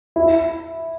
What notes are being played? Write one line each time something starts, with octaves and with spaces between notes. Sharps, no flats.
E4